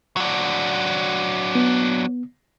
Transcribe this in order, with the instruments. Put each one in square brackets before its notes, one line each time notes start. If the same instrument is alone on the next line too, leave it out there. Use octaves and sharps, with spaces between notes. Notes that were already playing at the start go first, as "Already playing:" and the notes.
[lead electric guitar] F#3 D4
[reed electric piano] B3